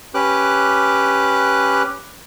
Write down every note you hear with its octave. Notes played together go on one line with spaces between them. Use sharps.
C#4 G4 B4 D6 F#6